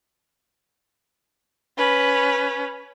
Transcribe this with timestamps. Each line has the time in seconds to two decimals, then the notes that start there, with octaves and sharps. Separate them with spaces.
1.78 C#4 B4